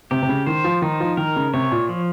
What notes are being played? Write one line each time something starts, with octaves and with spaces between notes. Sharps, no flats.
C3 G4
C3
C#3
D#3 C5
F3
D#3 D#4
F3
D#3 A#4
C#3
C3 C#5
A#2
F3